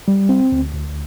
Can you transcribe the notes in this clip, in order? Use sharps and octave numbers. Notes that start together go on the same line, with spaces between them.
G3
C4
D2
D2